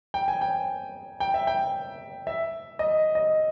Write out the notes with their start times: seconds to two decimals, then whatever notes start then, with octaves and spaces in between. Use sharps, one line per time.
0.14 G5
0.28 G#5
0.41 G5
1.20 G5
1.34 E5
1.47 G5
2.27 E5
2.79 D#5
3.15 D#5